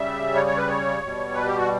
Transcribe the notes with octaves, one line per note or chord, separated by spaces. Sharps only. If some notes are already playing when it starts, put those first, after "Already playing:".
Already playing: C#3 G3 E5
C#5
C#5
B4
C#5
B2 G3
B4
G4
F#4